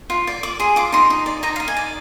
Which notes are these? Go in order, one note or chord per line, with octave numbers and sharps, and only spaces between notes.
F4
D5
D5 D6
G#4 C6
F4 D6
D#4 C6
D#4
D5
D#4 A#5
F5
D#4
G#5
D5